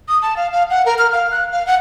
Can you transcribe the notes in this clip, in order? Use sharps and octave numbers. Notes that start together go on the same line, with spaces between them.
D#6
A5
F5
F5
F#5
A#4
F6
F5
F#6
F5
F#5